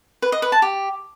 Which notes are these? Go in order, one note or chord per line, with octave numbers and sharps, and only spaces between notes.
B4
D#5
B4
A5
G4